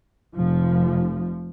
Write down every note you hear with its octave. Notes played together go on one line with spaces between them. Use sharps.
F1 F3